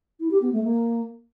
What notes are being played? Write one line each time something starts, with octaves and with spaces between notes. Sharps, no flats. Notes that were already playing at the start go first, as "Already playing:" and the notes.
E4
G4
B3
A3
A#3